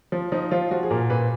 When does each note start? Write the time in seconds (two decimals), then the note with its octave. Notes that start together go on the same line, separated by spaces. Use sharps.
0.12 F3
0.32 F3 D#4
0.51 F3 F4
0.71 F3 F#4
0.83 G#4
0.90 A#2 A#4
1.10 A#2 B4